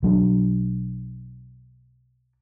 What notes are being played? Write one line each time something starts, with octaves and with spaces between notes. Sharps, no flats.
B1 F#3 D4